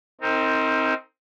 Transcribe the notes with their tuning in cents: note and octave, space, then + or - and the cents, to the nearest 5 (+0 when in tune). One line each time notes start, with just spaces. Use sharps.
C4 +5 D#4 +25 A#4 -30